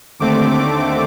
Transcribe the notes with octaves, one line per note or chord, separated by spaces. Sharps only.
D#2 D3 A3 C4 D6
D6